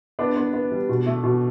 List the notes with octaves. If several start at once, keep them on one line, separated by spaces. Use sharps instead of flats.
B3 D4
B3
B3
G3
B2
A3
B2